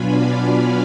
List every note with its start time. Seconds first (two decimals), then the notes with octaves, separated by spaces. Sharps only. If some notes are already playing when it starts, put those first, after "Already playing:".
Already playing: B2 F#3 B3 D4 F4 G#5 B5
0.10 D5 F5